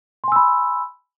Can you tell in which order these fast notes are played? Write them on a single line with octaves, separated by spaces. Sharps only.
C6 G#5 E6 B5